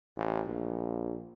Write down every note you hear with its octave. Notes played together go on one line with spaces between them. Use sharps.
A1
A#1